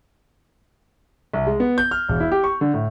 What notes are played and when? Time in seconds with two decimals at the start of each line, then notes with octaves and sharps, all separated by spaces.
1.34 C2
1.47 G#3
1.60 B3
1.78 G6
1.91 F6
2.09 E1
2.20 E4
2.32 G4
2.44 C#6
2.61 D3
2.74 A2